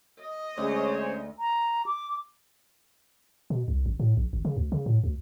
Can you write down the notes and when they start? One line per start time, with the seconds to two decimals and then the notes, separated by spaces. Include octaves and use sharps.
0.19 D#5
0.57 D2 G#3 C#4 C5 C#5
1.39 A#5
1.86 D6
3.50 B2
3.68 C2
3.86 A1
4.00 A2
4.17 A#1
4.33 G#1
4.45 C#3
4.57 D2
4.72 C#3
4.86 A2
5.04 D2